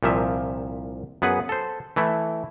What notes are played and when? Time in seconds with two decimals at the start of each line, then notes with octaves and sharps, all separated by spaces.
0.03 C2 A#2 F3 E5
1.22 F#2 B3 G#4 B4 F#5
1.49 A4 C5
1.96 E3 A3 E4